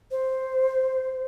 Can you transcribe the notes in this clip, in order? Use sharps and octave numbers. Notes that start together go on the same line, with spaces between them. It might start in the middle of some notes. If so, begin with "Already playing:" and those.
C5